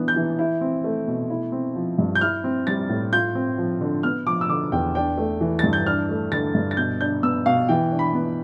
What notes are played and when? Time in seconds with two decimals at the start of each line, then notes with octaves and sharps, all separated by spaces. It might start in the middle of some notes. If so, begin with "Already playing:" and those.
Already playing: E3 B3 D4
0.08 G6
0.16 E3
0.39 E4
0.61 C4
0.84 A3
1.08 B2
1.30 E4
1.52 C4
1.76 F3
1.98 G2
2.15 G6
2.21 E4 F6
2.44 C4
2.67 G3 A6
2.89 A2
3.13 F4 G6
3.35 C4
3.58 F3
3.81 D3
4.03 B3 F6
4.26 F3 D6
4.41 E6
4.49 D3 D6
4.72 E2 G5
4.95 D4 G5
5.17 A3
5.41 E3
5.59 G2 A6
5.73 G6
5.86 D4 F6
6.09 A3
6.32 D3 A6
6.55 G2
6.71 A6
6.77 B2 G6
7.01 D4 G6
7.23 B3 E6
7.46 B2 F5
7.69 E3 G5
7.92 D4
7.99 B5
8.14 B3